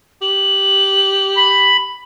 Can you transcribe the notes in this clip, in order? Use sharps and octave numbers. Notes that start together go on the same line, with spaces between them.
G4 F#7
B5